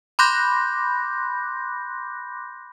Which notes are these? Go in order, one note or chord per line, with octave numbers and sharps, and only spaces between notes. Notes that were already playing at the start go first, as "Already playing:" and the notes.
B5 C6 D6 F#6 G6 A#6